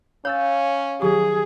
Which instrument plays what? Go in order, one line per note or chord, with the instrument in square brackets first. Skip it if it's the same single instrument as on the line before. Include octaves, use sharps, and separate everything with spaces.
[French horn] C#4 [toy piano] C#5 [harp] F5 E6 A6
[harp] D#3 F#3 [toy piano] G4 [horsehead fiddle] G#4